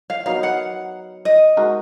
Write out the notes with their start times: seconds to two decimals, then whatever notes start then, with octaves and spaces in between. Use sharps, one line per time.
0.10 F5
0.26 F#3 B3 D#4 A#4 F5
0.43 F#5
1.25 D#5
1.57 G#3 D#4 F#4 A#4